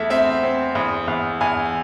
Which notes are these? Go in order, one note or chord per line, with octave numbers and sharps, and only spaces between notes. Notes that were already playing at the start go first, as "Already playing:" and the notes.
Already playing: E2 A3 E5
C4 E5
C4
E2
E2
E2 G#5